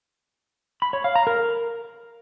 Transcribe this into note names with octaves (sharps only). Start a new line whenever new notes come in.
B5
C#5
F5
A#5
A#4